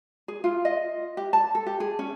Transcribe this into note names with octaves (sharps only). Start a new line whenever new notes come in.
G#4
F4
D#5
G4
A5
A4
G4
G#4
C#4